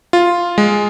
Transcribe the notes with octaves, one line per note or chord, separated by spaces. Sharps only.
F4
G#3